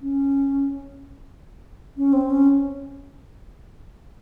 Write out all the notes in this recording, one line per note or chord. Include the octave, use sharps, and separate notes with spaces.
C#4
C#4
C4
C#4